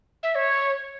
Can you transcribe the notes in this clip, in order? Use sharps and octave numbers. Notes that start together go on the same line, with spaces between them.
E5
C#5